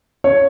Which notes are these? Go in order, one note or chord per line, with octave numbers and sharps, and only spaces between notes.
C#5